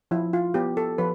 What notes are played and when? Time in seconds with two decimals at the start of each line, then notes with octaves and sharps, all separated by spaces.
0.11 F3 E4
0.33 F4
0.54 B3 G4
0.77 A4
0.98 F3 B4